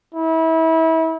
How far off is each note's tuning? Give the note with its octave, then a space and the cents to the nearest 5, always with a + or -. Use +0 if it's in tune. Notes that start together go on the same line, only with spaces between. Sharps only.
E4 -30